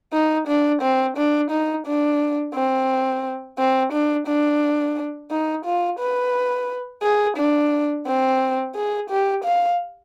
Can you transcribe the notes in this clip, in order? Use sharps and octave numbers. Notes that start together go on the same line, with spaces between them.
D#4
D4
C4
D4
D#4
D4
C4
C4
D4
D4
D#4
F4
B4
G#4
D4
C4
G#4
G4
F5